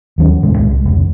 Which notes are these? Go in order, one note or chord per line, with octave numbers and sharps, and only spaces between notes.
D#2 F#3 C#4
F1 A2 C3 G#3
C2 G#3
F1 C#2